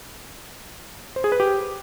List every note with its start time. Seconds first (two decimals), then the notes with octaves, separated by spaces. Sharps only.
1.16 C5
1.24 G#4
1.32 B4
1.40 G4